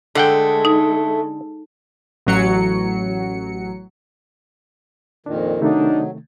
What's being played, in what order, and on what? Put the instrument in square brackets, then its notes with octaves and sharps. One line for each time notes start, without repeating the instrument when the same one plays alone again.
[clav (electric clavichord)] D3 F#5 G5 [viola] G#3 A4 [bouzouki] A3
[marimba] D#4
[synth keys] A1 F#3 C#7
[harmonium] F2 A#2 D#3 [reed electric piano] D4
[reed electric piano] C3 D#3 A3 [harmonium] F#3 [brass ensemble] D4 D#4